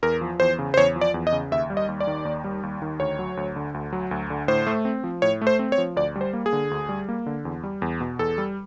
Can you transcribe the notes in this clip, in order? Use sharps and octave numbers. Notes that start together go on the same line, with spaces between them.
E2 A#4
F3
E2 C5
C#3
C5
E2 C#5
F3
D5
E2
D#5
C#3
D#2 E5
G3
D#5
D#2
D5
D#3
D#2
G3
D#2
D#3
D2 C#5
F#3
D2
D3
D2
F#3
D2
D3
A2 C5
A3
C4
F3
A2 C#5
A3
C5
C4
C#5
F3
D2 D5
G3
C5
A#3
G#4
D3
D2
G3
A#3
D3
E2
G3
E2
B2
E2 A4
G3